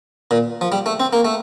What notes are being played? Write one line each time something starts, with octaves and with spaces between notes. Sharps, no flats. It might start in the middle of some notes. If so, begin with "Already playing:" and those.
A#2
F3
G3
A3
C4
A#3
A3